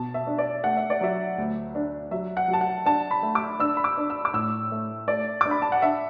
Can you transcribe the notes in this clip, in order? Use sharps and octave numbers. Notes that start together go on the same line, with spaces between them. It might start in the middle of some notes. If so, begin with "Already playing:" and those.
Already playing: B2 A5
E5
D4
D5
A3 F#5
E5
D5
F#3 E5
D2
D4
F#3 E5
F#5
F#3
A5
F#5
D4 A5
B5
A3
D6
D4 E6
B5
D6
D4
E6
D6
A2 E6
A3
A3 D5
D4 D6
B5
A5
F#5
D4 E5